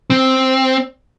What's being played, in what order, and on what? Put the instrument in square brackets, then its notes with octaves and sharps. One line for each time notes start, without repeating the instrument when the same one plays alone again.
[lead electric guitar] C4